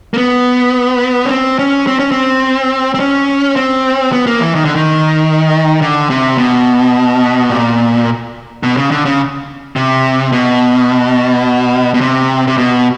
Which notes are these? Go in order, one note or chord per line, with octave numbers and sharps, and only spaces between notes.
A#3
B3
C#4
C4
C#4
C4
C#4
C4
C4
C#4
C4
B3
A#3
E3
D#3
D3
D#3
D3
C3
B2
A#2
B2
C#3
D3
C#3
C3
B2
B2
C3
C3
B2